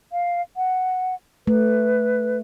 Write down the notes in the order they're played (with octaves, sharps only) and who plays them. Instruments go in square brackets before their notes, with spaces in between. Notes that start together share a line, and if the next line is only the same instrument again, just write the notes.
[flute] F5
F#5
[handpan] A3 [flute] B4